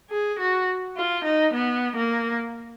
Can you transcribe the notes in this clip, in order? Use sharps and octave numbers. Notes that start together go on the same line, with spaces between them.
G#4
F#4
F4
D#4
B3
A#3